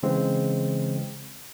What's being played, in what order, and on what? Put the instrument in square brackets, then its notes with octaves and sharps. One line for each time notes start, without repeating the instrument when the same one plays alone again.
[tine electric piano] C#3 E3 G#3 C4